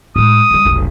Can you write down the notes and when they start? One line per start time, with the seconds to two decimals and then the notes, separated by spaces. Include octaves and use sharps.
0.16 A2 G#3 D#6
0.51 C#2 G3
0.65 F1 B1